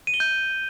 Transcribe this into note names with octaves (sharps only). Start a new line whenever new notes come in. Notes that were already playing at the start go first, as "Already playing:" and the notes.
D#7
G7
G6